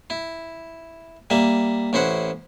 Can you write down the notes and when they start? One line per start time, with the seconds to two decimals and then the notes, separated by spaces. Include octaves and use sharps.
0.10 E4
1.30 G3 A#3 E5
1.93 A1 C#4 E4 C5 F#5